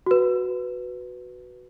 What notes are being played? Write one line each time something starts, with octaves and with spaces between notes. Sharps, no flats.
F#4 B4